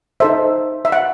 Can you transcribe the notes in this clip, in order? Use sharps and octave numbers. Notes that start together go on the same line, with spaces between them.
D#4 A4 C5 E5
E5
F#5